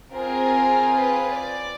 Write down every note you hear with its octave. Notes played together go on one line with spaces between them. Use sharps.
C4 F4 G#4 A#4
B4
D5